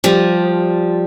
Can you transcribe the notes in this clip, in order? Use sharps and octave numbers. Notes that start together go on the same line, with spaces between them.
F3 G3